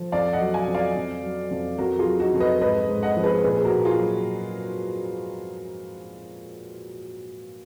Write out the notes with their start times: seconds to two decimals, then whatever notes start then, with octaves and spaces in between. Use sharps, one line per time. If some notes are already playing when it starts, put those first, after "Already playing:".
Already playing: F3
0.12 F2 D5 F5
0.33 D#5 F#5
0.40 F#3
0.54 F5 G#5
0.68 F2
0.75 D5 F5
0.95 F2
1.23 F#3
1.51 F2
1.78 F2 F#4 A#4
1.99 F4 G#4
2.06 F#3
2.19 D#4 F#4
2.34 F2
2.40 B4 D#5
2.61 G#2 B4 D#5
2.89 G#2
3.03 D#5 F#5
3.17 F3
3.23 G#4 B4
3.44 A#2 G#4 B4
3.58 G#4
3.65 F#4 A#4
3.72 A#2
3.85 F4 G#4
4.00 F#3